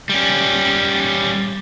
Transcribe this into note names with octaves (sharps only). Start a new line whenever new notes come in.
G3 C#4